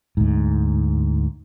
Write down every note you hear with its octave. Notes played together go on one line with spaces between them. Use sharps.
D2 G#2